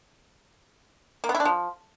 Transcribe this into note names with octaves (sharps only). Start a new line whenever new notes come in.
A#3
B3
E4
D4
F3